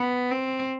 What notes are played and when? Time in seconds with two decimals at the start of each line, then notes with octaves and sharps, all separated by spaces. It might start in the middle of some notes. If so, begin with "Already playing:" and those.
Already playing: B3
0.30 C4